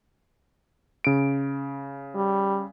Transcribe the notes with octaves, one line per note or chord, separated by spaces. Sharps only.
C#3 D7
G3